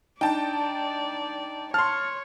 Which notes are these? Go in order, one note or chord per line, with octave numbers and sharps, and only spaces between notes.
D4 D#4 D5 G5 A5
C#5 A5 C6 F6